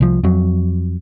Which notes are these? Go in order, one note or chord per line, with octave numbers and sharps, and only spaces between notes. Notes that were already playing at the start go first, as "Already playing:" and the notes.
C2 F3
F2 F#3